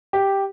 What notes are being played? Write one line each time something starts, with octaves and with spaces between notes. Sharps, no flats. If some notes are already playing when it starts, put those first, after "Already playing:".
G4